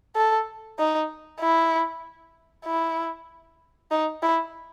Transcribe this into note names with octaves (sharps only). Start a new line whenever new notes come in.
A4
D#4
E4
E4
D#4
E4